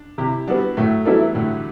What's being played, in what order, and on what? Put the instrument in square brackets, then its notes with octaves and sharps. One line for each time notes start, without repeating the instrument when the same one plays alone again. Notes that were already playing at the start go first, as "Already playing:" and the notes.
Already playing: [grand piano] D4
[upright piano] C3 [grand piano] E4 G4
[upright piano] G3 B3 [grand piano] D4 F#4
[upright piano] A2 [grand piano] F#3 A3
[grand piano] E3 G3 [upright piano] F#3 B3 E4 A4
[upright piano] A2 [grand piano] D3 F#3